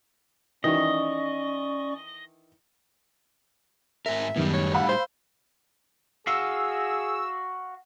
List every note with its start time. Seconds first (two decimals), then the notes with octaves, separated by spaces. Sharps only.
0.64 D#3 E3 C#4 D5 D#5 C#6
4.06 G#2 A#4 E5
4.36 F#2 A2 D#3 G3 B3
4.54 C#5
4.74 F5 F#5 B5 E6
4.89 C5
6.27 F#4 G#4 F5 E6